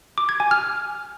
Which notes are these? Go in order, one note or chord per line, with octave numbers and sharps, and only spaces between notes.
D6
G#6
G#5
F6